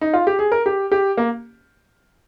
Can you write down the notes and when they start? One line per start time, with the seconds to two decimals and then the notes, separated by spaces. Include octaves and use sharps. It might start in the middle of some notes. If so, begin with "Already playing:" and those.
0.01 D#4
0.14 F4
0.27 G4
0.39 G#4
0.52 A#4
0.66 G4
0.92 G4
1.17 A#3